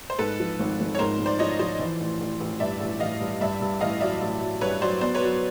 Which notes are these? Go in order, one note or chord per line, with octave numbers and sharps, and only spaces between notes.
C5
G#2 A4 B4
F3
G#1
G#1
C#5
G#2 A#4 C5
G#2
C5 D5
F3 C#5 D#5
F3 C5 D5
E3
A1
A1
A1
G2 D5 E5
A1
A1 D#5 F5
G2
G2 D5 E5
G2
A1 D#5 F5
F#3 D5 E5
A1
F#3
G2 B4 C#5
F#3 C5 D5
B3 C5 D5
B4 C#5
F#3